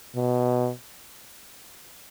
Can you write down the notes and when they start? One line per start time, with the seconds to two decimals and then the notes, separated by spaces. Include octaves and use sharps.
0.16 B2